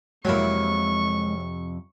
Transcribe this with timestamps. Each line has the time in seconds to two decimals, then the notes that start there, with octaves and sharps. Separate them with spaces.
0.25 F2 C3 F#3 G#3 A#3 E4 C#6